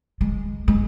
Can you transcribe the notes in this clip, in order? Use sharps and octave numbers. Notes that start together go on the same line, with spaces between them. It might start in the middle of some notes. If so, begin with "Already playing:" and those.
G#3
G#3